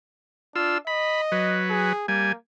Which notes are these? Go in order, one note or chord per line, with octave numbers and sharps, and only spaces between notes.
D4 F4 E6
D#5 B5
F#3 B4
G#4
G3 A#3 G#5